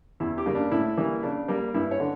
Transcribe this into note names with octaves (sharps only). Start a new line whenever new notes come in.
E2 E4
G4
C#3 G3 A#3
D4
A2 E4
E3 G3 A#3
C#3 D4
G3 A#3
G2 E4
C#5
D3